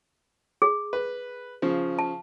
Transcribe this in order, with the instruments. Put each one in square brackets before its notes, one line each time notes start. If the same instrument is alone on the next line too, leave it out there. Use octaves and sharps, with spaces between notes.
[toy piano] G#4
[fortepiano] B4
C#3 F3
[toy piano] A5